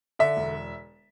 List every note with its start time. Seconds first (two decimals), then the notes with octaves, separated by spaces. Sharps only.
0.19 D3 E5
0.37 E1